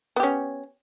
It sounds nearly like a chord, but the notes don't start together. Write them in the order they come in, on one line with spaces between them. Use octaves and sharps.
B3 G4 C#4